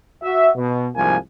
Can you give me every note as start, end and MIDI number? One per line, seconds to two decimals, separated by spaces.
0.22 0.49 66
0.22 0.49 76
0.55 0.87 47
0.95 1.16 36
0.95 1.16 44
0.95 1.16 53
0.95 1.16 58
0.95 1.16 80